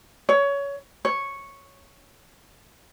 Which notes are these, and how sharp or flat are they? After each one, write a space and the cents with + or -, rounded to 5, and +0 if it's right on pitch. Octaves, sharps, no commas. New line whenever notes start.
C#5 +20
C#5 -5